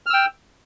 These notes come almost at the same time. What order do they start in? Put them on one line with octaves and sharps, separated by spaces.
F6 E6 G5